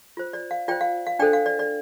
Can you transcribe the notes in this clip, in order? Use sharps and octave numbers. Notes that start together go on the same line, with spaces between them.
F4 C5
D5
F5
F4 C5 D5 G5
F5
F5
D4 A4 C5 D5 G5
F5
D5
D5